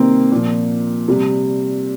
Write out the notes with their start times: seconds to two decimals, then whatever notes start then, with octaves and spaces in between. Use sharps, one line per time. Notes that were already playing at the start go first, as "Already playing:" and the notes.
Already playing: C3 D#3 G3 A#3 C4
0.32 A#2 F3
1.08 C3 G3